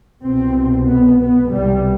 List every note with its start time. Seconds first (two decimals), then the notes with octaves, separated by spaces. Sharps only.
0.22 C2 B2 C4
0.86 B3
1.18 B3
1.50 C2 B2 G3